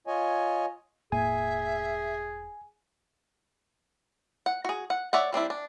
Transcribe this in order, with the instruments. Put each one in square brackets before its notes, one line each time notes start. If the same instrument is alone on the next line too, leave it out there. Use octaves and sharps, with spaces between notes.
[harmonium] F4 C#5 D#5 G#5
[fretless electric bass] E1 A2 A#3 [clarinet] G#4 [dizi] E5 [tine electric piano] G#5
[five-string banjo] F#5
F#4 G#4
F#5
C#5 D5 E5 F#5
G3 C4 D4 E4
D4